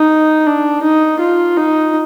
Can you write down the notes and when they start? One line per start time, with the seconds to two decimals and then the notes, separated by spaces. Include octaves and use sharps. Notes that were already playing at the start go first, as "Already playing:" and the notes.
Already playing: D#4
0.46 D4
0.83 D#4
1.20 F4
1.57 D#4